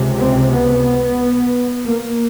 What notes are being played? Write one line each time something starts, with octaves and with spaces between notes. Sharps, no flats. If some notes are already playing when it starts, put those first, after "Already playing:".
Already playing: C#2 C3
C4
B3
A#3